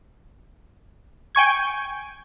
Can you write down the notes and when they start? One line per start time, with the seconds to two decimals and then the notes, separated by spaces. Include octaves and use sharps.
1.35 G5 G#5 C#6 G#6